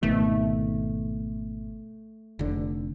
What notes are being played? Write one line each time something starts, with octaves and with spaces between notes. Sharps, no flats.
G#1 B2 D#3 A3
F1 D3